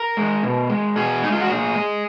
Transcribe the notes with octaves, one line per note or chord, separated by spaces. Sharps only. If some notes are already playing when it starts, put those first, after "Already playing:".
Already playing: A#4
G#3
B2
G#3
B2 G#4
G#3 D#4
F4
F#4
A#2 G#4
G#3